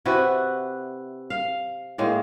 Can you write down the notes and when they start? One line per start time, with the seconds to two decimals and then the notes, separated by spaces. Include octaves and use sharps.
0.05 C3 E4 F#4 B4
1.30 F5
1.98 A2 G#3 A#3